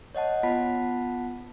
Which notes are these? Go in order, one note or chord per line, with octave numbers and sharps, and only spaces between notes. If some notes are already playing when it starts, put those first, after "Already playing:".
C#5 D#5 F#5 A5
B3 F4 F#5 A5 B5 B6